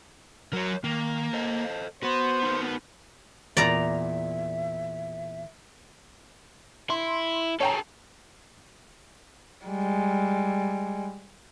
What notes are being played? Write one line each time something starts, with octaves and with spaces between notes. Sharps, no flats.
F#3 A#4 C#5
D#3 A#3
A4 C5 D#5
B3 F#4 B4 C5
D#4 F#4 A#4
E2 A#2 D5 E5 A#5
E4 C6
G#4 A4 C#5 G5 A#5
G3 G#3